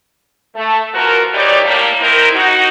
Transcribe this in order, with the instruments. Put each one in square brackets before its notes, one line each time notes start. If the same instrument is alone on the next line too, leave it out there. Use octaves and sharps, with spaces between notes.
[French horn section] A3
E2 F3 F#4 A#4
E3 G3 D#4 G4 C#5 D5
A2 G3 A#3
D#2 C4 D#4 E4 A#4
D#4 F#4